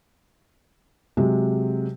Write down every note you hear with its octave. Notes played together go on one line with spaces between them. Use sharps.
C3 F#3 G#3